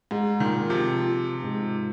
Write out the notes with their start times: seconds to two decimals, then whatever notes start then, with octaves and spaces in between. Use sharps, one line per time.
0.11 G#2 G#3
0.40 A#2 D#3
0.54 A#4
0.69 C3 F3
0.98 F4
1.43 G#2